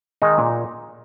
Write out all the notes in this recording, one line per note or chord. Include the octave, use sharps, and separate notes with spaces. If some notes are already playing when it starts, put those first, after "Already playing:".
D#3 G#3 D#4
A#2